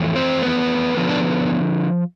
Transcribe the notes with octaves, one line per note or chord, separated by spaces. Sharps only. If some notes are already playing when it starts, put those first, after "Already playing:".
Already playing: F2 E3 A3
C4 C5
B3 B4
D3 F3 B3
D4